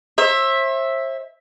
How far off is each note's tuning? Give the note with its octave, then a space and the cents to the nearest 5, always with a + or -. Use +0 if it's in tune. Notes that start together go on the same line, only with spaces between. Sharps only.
C5 +40 E5 +0